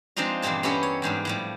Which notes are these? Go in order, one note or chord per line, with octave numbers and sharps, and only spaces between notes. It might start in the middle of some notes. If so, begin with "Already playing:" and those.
F3 G#3 C4 D4 D#4 F4
E2 G2 A#2 C4 G4 A5
B3 C#4 E4 G4 A4 A#4
C#5
E2 G#2 G3 D4
A2 F3 G3